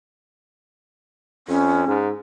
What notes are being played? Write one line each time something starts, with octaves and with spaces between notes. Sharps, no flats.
F2 C#4
G#2